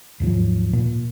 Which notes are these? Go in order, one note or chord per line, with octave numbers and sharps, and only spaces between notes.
D#2 G#2 F3 F#3
A#2